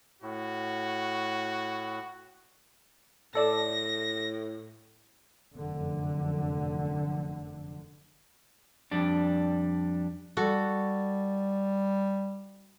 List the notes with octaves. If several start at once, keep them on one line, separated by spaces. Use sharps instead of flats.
A2 F#4
A2 A4 D5 A5 A#6
F1 F#2 D3
F2 G3 D4
G3 F#4 A4